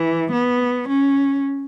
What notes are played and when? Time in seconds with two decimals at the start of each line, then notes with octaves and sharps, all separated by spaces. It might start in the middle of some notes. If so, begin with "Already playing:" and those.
Already playing: E3
0.32 B3
0.89 C#4